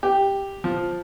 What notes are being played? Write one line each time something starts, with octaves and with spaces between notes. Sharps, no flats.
G4
F3